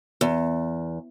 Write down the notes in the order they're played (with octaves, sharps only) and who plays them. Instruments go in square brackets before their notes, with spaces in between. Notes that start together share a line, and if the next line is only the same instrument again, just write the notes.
[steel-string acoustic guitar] E2